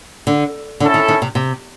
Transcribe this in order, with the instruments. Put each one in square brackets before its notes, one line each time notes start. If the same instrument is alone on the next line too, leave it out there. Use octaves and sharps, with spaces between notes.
[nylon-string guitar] D3
[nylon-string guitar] D3 [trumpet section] C#4 E4 A4
[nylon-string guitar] D#3
D#3
C3
C3